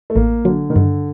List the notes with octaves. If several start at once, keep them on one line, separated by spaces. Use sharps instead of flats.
A3
A1 A#3
D3 F#3
D#3
G2 D3